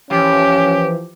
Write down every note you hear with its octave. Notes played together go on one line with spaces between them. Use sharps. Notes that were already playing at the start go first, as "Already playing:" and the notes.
E3 F3 C#4 G4